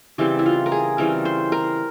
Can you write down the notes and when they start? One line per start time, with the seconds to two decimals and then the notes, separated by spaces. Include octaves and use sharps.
0.18 C#3 E3 G3 C4 G4
0.39 E4
0.46 F4
0.66 A#4
0.72 G#4
0.98 C#3 E3 G3 C4 A#4
1.25 C5
1.52 A#4